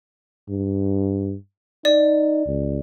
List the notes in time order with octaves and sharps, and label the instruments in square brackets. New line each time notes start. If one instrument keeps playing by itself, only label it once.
[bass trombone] G2
[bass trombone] D#4 [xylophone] D5
[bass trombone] C#2